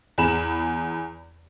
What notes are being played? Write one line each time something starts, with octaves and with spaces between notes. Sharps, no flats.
E2 G#4 B5 E7